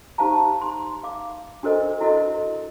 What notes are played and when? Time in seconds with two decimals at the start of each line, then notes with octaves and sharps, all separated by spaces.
0.18 D#4 G4 C5 F5 A5 A#5
0.61 C6
1.04 F5 D6
1.63 D4 F#4 A4 A#4 C5 D#5
2.00 E4 F#4 A4 A#4 D#5